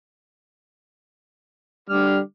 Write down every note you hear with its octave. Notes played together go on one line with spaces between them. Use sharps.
D3 G3 D6 F6